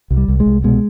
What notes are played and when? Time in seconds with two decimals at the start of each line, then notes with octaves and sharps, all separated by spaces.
0.11 C2
0.17 G3
0.28 C2
0.40 G#3
0.46 C2
0.64 B2 G#3